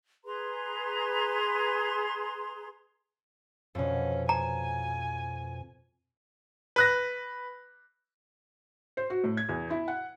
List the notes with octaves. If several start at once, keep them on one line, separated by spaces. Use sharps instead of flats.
G#4 B4 A#5 C6
F2 B2 C#4
G#5 A#5
B4 F#6 A#6
C5
F#4
A2
G#6
E2
E4
F#5